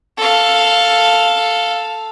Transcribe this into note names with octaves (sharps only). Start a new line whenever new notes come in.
A4 F5